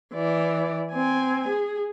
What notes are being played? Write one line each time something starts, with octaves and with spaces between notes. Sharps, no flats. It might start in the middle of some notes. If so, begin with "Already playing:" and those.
E3 D5
C4 G#5
G#4